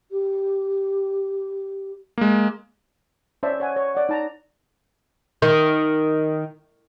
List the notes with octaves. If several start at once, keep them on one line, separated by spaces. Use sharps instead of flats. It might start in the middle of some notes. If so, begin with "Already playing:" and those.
G4
G#3 A#3
C#4 C5 D5 E5 A5
C#5 F#5 G#5
C#5
D5 F#5
D#4 A5 A#5
D#3